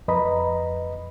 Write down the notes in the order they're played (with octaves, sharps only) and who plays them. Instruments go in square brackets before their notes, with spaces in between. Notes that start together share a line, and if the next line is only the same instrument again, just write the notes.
[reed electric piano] F2 B4 D#5 A#5 B5